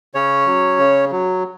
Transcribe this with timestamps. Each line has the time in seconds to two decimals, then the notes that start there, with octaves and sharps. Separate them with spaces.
0.15 C#3 C#4 C#5
0.46 F#3
0.79 C#3
1.11 F#3